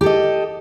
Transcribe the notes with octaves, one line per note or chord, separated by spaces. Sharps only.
G4 A4 D#5